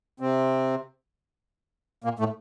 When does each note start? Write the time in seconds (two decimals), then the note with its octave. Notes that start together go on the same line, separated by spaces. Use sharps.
0.20 C3 C4
2.04 A#2 A#3
2.19 A2 A3